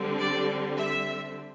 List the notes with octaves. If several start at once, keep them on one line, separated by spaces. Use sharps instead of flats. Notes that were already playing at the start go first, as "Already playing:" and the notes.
Already playing: D3 G3 C4
D5
E5